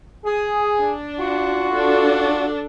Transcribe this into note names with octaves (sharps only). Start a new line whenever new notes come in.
G#4
D4
F4 F#4
D4 A4